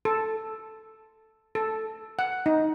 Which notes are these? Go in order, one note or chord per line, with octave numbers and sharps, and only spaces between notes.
A4
A4
F#5
D#4